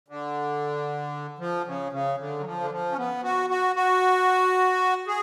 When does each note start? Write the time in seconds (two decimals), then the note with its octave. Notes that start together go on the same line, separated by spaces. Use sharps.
0.08 D3
1.39 F3
1.66 C#3
1.92 C#3
2.18 D3
2.40 F#3
2.44 F3
2.60 D3
2.71 F3
2.92 C#4
2.97 B3
3.23 F#4
3.50 F#4
3.76 F#4
5.07 G#4